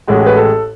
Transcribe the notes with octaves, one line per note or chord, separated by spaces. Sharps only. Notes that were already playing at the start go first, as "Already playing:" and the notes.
A1 A2 G#3 F#4
B4
A4